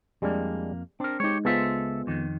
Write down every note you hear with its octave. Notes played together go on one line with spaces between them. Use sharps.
F2 G3 G#3 A#3 D4
C4 D4 A#4
G#3 D#4 G4 C#5
C#2 G#3 B3 F4 A4 C5 E5
F2 D#3